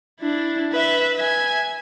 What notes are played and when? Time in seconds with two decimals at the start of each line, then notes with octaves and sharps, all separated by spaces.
0.20 D4 E4
0.73 B4 E5
1.17 E5 G#5